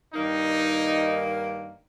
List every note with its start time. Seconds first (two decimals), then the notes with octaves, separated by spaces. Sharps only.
0.13 G2 D#3 A#3 D#4